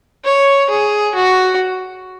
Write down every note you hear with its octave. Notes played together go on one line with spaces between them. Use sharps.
C#5
G#4
F#4